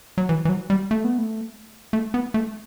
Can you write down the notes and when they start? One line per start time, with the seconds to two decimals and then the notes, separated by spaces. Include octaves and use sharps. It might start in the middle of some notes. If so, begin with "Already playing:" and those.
0.18 F#3
0.29 E3
0.45 E3
0.49 F#3
0.70 G3
0.91 A3
1.04 B3
1.18 A3
1.93 A3
2.14 B3
2.34 A3